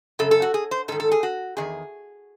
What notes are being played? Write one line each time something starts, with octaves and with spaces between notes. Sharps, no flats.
F#2 C#3 A4
A4
F#4
G#4
C5
G#2 D#3 A4
A4
G#4
F#4
E2 C3 D#3 G#4